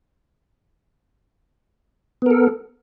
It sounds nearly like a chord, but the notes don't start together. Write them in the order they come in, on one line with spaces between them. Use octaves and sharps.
B3 A#4 A4